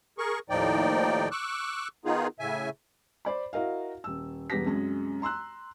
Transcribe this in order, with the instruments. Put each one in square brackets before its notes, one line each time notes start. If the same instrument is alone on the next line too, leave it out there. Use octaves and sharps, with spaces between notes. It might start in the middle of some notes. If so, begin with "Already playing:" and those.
[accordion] G#4 A#4 C#6
D#2 A2 F3 D#4 D5 G5
C#6 D6 E6 F#6
D#3 B3 D#4 F4 G#4
A2 C#3 E5 G#5
[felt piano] C5 D5 B5
E4 F#4 A#4 D#5 F5
D#1 E6
E1 G3 B3 G4 A#6 B6
C2 F#2 G#3
A#5 C6 E6 F#6